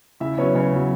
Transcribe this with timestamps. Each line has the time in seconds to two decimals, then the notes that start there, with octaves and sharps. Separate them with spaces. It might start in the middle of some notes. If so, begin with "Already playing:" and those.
0.20 C#3 E4 E5
0.38 F#3 B3 C#4 C#5
0.54 C#3 C#4 C#5
0.72 F#3 B3